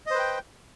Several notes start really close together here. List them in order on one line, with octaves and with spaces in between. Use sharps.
D#5 C5 B4 G5